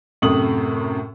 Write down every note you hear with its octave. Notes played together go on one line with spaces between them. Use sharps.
F#2 A2 C3 D#6 F#7